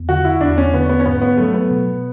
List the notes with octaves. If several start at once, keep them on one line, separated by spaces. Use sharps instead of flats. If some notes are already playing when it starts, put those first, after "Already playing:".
Already playing: E2
D3 F#4
E4
E2 D4
C#4
D3 B3
B3
C#4
G#2 B3
B3
F#3 A3
B3
B2